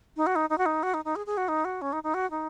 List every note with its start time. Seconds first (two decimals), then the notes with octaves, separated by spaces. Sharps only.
0.17 D#4
0.27 F#4
0.36 D#4
0.50 D#4
0.58 F#4
0.66 D#4
0.83 F#4
0.94 D#4
1.05 D#4
1.16 G#4
1.26 G#4
1.37 F#4
1.48 D#4
1.65 F#4
1.82 C#4
1.93 D#4
2.03 D#4
2.14 F#4
2.31 D#4